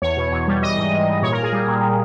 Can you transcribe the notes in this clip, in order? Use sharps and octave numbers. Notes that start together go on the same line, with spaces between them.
E2 C#5
B2
E2
G3
E3 D#5
G#2
G#2
E3
A#2 C#5
A#4
A#2
G#4
G3
A#2